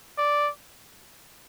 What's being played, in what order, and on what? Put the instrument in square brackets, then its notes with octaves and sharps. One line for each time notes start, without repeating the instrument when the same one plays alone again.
[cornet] D5